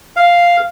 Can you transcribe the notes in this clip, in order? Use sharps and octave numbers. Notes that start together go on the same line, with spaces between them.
F5